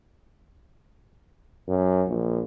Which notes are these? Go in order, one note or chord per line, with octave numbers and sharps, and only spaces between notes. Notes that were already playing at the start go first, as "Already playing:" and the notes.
F#2
A#1